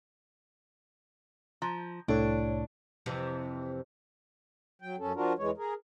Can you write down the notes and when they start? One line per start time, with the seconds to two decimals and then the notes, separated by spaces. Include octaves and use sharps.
1.62 F3 A#5
2.08 C2 A2 D4 A4 C#5
3.06 F2 C3 E3
4.82 F#3 G5
4.99 F#2 C#4 A4
5.15 F3 D4 F4 F#4 A#4
5.38 E2 E3 G#3 C#5
5.57 G#4 A#4